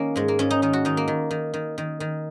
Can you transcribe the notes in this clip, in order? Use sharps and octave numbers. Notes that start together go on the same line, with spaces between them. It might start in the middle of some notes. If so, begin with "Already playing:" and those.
Already playing: D#3 A#3 C#4
G#2 G#3
A#3
G#2 C#4
D#4
D#3 D#4
F#4
D#3 D#4
A#3
D#3
D#3
D#3
D#3
D#3